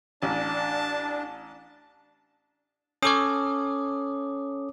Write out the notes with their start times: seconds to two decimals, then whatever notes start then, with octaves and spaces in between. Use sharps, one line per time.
0.23 A1 D4 A5
3.03 C#4 A4 C#5 D6 D#6